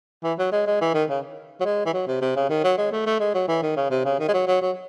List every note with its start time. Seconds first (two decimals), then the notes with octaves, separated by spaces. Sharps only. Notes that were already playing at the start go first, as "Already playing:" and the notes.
0.23 E3
0.38 F#3
0.52 G#3
0.66 G#3
0.81 E3
0.94 D#3
1.09 C#3
1.60 F#3
1.65 G#3
1.86 E3
1.94 F#3
2.07 C3
2.21 C3
2.36 C#3
2.49 D#3
2.64 F#3
2.78 G#3
2.92 A3
3.06 A3
3.20 G#3
3.34 F#3
3.48 E3
3.62 D#3
3.76 C#3
3.91 C3
4.05 C#3
4.19 D#3
4.28 G#3
4.33 F#3
4.47 F#3
4.61 F#3